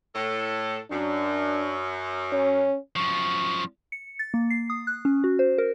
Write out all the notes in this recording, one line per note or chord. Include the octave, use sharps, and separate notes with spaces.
A2 A4
F#2 D4
C#4
F#2 F3 C#6
C#7
A6
A#3
C7
D#6
F#6
C#4
F#4
C5
A#4